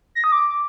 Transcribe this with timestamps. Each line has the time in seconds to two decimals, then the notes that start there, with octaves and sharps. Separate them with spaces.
0.15 A#6
0.24 D#6
0.32 D6